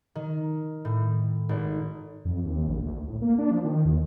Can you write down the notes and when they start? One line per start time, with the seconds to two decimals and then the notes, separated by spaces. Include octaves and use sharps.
0.15 D#3
0.85 A2
1.49 G#1
2.25 F2
2.45 D#2
2.68 A#1
2.83 D2
3.07 A2
3.22 A#3
3.38 D4
3.51 F3
3.64 D#3
3.85 D#2